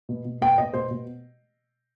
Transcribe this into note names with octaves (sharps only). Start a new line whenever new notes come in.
B2
B2
B2 G5
B2 D#5
B2 C5
B2